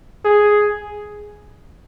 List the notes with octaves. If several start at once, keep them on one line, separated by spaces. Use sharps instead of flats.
G#4